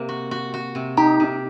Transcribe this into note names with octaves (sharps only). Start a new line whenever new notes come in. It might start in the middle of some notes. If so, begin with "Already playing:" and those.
Already playing: C3 A#3
F#4
F#4
F#4
C3
D#4 G4
C3